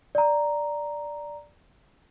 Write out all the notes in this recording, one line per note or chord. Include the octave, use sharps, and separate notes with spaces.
D5 A#5